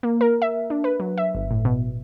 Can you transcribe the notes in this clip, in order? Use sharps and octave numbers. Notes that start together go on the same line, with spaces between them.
A#3
A#4
E5
D4
B4
F#3
E5
G1
A2
B2